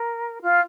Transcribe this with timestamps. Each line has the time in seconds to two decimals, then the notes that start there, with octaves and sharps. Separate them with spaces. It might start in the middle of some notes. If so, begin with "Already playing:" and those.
Already playing: A#4
0.42 F4